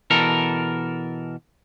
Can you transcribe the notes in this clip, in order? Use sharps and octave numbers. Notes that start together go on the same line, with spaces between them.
B2 E3 A4 A#4